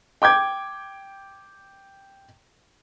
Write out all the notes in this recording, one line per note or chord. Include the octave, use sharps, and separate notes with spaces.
G5 D6 G6 G#6